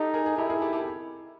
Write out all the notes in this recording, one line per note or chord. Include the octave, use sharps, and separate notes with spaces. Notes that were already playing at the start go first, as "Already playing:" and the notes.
Already playing: D#4 G4 A4
G#4 A#4
G#4
E4 G4 A4
G#4 A#4
G4 A4
G4 A4